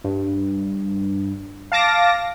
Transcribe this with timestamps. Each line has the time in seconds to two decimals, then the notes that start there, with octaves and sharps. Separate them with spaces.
0.04 G2
1.72 F5 A5 D6 A#6